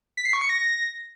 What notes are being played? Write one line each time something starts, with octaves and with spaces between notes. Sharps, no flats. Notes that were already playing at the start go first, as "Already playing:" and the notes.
B6
C7
C#6
C#7
A#6